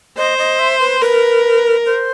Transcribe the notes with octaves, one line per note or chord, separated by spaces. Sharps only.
C5 D#5
D#5
E5
B4
A#4 B4
C5